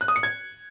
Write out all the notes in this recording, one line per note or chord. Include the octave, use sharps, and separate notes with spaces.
F#6
D#6
C#7
G#6